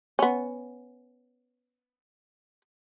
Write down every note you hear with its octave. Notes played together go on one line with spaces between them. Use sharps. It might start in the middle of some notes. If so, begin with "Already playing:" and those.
B3 C#4